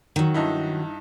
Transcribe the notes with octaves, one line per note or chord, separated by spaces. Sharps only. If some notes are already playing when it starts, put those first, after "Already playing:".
D#3 F#3
G2 D#4 E4